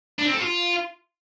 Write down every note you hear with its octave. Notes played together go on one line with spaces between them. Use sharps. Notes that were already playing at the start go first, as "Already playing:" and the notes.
D4
C4
A4
F4